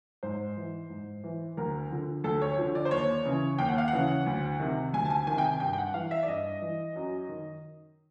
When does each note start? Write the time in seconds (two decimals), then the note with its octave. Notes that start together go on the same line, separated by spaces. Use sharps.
0.23 G#2 C5
0.57 E3
0.90 G#2
1.24 E3
1.57 D2 A#4
1.91 D3 F3
2.24 D2 A4
2.42 C#5
2.58 D3 F3
2.75 D5
2.85 C5
2.91 D#2 C#5
3.25 C#3 E3
3.59 D#2 G5
3.68 F#5
3.78 F5
3.88 F#5
3.93 C#3 E3
4.26 D2
4.59 C3 D#3
4.93 D2 G#5
5.05 A5
5.10 G#5
5.27 C3 D#3 G#5
5.38 G5
5.44 G#5
5.60 G2 G5
5.73 G5
5.78 F#5
5.94 E3 F5
6.11 E5
6.23 D5
6.28 G2 D#5
6.62 E3
6.96 F#2
7.29 D#3